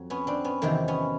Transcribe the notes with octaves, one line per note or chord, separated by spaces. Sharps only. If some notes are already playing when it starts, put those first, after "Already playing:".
Already playing: F2 F#3
B3 C#4
C4 D4
B3 C#4
E2 C3 D#3 F#3 A#3 C4
B3 C#4